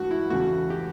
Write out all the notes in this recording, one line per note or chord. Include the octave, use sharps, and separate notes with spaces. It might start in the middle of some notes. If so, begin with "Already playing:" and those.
Already playing: G2 E3 A3 F#4
E4
E2 C#3 E3 A3 F#4
G4